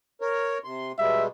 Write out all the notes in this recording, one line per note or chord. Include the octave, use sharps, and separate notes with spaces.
A#4 C#5
C3 C6
B2 G3 G#3 E5